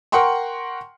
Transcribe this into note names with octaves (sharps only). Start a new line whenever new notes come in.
A#4 F#5 G5 C6 C#6